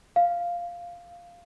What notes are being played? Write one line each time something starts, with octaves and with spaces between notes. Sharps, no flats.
F5